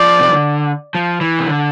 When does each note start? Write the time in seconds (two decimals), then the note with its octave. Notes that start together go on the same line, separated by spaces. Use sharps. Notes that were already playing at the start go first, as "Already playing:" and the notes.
Already playing: F3 D5
0.20 C3
0.30 D3
0.95 F3
1.21 E3
1.39 C3
1.47 D3